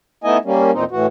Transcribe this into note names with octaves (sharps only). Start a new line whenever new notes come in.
A3 B3 D#4 E4 D#5 G#5
G3 A#3 C#4
E2 A#2 C4 D#4
A2 E3 F#4